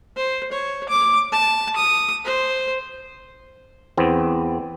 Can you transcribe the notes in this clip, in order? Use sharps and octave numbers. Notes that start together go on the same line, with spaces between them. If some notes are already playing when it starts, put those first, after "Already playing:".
C5
C#5
D6
A5
D#6
C5
E2 B3 C4